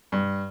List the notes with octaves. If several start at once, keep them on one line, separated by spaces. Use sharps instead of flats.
G2